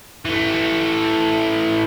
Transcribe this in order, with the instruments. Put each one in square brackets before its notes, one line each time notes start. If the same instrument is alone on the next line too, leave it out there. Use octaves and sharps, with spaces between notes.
[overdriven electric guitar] E3 A3